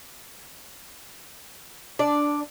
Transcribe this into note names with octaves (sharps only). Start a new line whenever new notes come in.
D4 D5